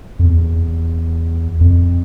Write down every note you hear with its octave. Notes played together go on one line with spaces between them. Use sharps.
F2
E2
F2